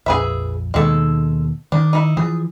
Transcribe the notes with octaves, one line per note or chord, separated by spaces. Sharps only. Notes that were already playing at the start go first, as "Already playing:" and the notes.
A#1 F2 G#4 B4 E5
D#2 B2 D#3 G#3 A4
D#3 D4
D#4 E4
E3 F3 G#4